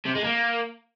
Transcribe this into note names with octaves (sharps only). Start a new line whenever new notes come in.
C3
G#3
A#3